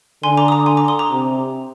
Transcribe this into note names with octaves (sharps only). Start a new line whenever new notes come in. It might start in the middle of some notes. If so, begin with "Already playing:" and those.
D3 G#5 C6
A#5 D6
D#6
A#5 D6
G#5 C6
A#5 D6
C6 D#6
A#5 D6
C3